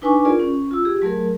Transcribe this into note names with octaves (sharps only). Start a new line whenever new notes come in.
D4 D#4 B4 G#5 C#6 D6
F4 G#4 A#4 D5
C#4
F4 E6
G4 G#4
F#3 A3 G#4 A#4